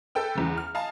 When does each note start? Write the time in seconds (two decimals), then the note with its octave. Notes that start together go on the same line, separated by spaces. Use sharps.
0.15 A4 B4 G5 E6
0.35 E2 C#3
0.57 F6
0.74 D#5 F5 G#5 A5